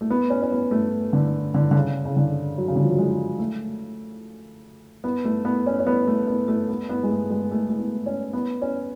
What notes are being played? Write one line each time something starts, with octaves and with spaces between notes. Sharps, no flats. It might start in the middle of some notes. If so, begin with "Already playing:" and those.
A3
B3
C#4
C#4
B3
A3
D3
D3
D3
C#3
C#3
D3
F#3
C#3
D3
F3
F#3
G#3
A3
B3
A3
B3
C#4
C#4
B3
A3
B3
A3
B3
B3
G#3
A3
G#3
A3
A3
B3
C#4
B3
C#4